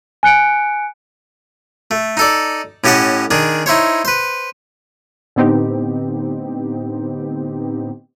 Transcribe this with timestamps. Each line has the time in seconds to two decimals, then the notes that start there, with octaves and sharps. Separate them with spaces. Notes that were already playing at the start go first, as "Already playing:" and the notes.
0.23 G#5 F#6 C#7 D7
1.91 A3
2.17 D#4 A4 D5
2.84 A2 C#4 G4 D#5 F#5 A5
3.31 D#3 D4 G#4
3.66 D#4 E4 C5 C#5
4.05 B4 C5
5.36 A2 D3 B3 C4 D#4 G4